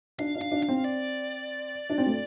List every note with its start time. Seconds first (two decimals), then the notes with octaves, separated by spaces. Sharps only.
0.19 D4 F5
0.36 D4
0.41 F5
0.52 D4
0.63 F5
0.68 C4
0.84 D5
1.90 D4
1.98 C4
2.06 A3